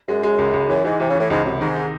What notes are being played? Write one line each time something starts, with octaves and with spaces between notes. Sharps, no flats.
F#2 G#3
G#3
C#2
C#2
F#2 E3
G#2 E3
C3 E3
C#3
A2 E3
C#2 G#2
F#2 C3
G#2 D#3
D#4